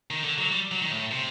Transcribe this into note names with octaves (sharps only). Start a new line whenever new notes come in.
D#3
D3
F#3
G3
F#3
D#3
A2
C3